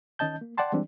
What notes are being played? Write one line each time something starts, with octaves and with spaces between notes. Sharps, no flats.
D#3 C#4 D#5 A5 G6
A#3
D5 F#5 G5 A5 C6
E3 G3 G#3 C4 D4